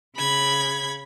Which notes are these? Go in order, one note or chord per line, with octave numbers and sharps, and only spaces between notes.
C#3 B5 G#6